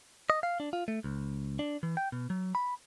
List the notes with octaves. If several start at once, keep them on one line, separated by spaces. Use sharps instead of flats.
D#5
F5
D4
F4
A3
C#2
D4
E3
G5
B2
F#3
B5